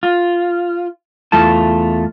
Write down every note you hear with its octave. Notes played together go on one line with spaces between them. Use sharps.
F4
E2 A3 F4 A5